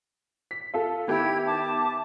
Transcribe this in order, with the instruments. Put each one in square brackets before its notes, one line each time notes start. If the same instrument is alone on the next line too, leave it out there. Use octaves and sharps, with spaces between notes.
[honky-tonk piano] B6
F4 A4
[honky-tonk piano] D#3 B3 G4 [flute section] E4 G5 G#6
[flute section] E5 A5 D6